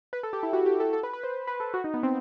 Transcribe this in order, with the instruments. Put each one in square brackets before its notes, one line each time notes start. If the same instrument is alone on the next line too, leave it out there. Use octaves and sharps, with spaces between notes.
[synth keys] B4
A4
G4
E4
F#4
G4
A4
A4
B4
B4
C5
B4
A4
F#4
D#4
B3
C4